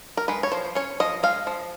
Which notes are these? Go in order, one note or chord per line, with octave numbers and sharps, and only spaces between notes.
A#4
G#3 B4
C#5
F3 C5
C#4 C#5
F3 D#5
G#3 F5
F3